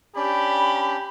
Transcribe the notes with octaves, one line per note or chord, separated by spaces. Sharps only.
C#4 D4 G4 D5 B5